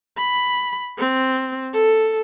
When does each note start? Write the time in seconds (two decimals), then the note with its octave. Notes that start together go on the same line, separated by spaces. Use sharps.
0.18 B5
0.98 C4
1.73 A4